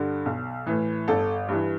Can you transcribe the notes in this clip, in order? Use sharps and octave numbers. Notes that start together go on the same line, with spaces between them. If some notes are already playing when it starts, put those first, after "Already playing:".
Already playing: G2 D3
B1
A2 E3
G1 A4
G2 E3